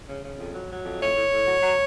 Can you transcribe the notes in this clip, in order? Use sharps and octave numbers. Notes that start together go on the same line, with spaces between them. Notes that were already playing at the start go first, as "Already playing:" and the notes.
C#3
C#3
F2
F#3
F#3
F2
A2 C#5
A2
A2
F#3
F#3